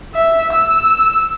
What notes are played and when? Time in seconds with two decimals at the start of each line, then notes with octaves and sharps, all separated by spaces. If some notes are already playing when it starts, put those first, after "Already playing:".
0.15 E5
0.53 E6